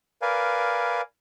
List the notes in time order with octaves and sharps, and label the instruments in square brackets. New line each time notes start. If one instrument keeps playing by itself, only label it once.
[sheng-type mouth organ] A#4 B4 D5 F5 G#5